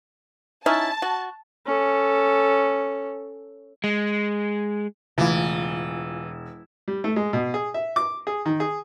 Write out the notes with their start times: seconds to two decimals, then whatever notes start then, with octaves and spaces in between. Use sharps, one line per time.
0.66 C#4 D#4 E4 A5
1.02 F#4
1.66 C#4 A4
3.84 G#3
5.18 E1 C#3 E3 A3 E4 F4 F5
6.88 G3
7.04 A3
7.16 G#3
7.33 B2
7.54 G#4
7.74 E5
7.96 D6
8.27 G#4
8.46 D#3
8.60 G#4